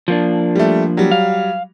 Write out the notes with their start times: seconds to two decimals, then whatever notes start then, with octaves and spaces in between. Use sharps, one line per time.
0.08 F3 A#3 D4
0.56 G3 A3
0.97 F#3 G3
1.11 F5